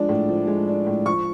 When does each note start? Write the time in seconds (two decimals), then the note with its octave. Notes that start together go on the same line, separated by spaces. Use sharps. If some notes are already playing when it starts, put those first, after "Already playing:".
Already playing: F3 G#3 D4
0.09 A2
0.29 F3
0.47 G#3
0.68 D4
0.87 A2
1.05 F3 C#6